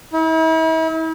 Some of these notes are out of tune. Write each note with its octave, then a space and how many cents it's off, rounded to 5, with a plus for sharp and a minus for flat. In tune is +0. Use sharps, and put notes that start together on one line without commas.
E4 -40